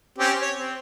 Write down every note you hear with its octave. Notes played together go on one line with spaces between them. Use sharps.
C4 C#4 G4
C#5
C4